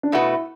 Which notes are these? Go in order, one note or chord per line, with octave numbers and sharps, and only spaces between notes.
D4
B2 A3 E4 F#4 B4